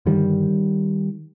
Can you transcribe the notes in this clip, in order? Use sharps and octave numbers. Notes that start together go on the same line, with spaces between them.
G2 D3 D#3 G3